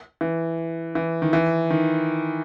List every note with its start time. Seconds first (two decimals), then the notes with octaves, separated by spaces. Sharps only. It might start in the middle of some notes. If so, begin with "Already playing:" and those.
0.21 E3
0.95 E3
1.22 D#3
1.33 E3
1.70 D#3